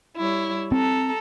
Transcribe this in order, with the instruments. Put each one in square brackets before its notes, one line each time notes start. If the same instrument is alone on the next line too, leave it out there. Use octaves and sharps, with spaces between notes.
[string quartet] G3 E4 C#5
[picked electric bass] C4 [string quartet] A4 A#5